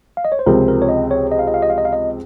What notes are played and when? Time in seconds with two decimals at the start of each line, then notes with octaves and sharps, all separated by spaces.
0.17 F5
0.25 D#5
0.32 C#5
0.39 C5
0.46 C#2 C3 F3 C4 A#4
0.68 A#4
0.82 C#5
0.89 D#5
1.11 C#5
1.32 D#5
1.39 F5
1.47 D#5
1.54 F5
1.62 D#5
1.70 F5
1.78 D#5
1.85 F5
1.93 D#5